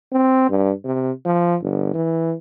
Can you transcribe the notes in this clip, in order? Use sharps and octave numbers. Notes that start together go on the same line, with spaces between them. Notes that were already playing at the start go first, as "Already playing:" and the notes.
C4
G2
C3
F3
G1
E3